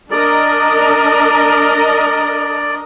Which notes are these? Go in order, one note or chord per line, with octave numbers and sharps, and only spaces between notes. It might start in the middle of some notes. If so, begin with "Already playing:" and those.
D4 A#4 D5 D#5